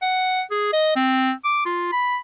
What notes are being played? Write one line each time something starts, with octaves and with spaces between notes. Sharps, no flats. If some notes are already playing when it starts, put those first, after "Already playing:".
F#5
G#4
D#5
C4
D6
F4
B5